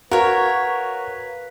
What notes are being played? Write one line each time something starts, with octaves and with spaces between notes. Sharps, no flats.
F#4 A#4 B4 C#5 F5